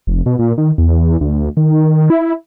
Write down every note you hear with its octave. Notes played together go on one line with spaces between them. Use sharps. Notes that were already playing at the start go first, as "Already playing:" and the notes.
F1
B2
A#2
D#3
E2
D2
D#3
E4